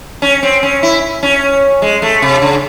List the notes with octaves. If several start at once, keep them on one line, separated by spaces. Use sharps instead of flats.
C#4
C4
C#4
E4
C#4
G#3
A3
C3
C#3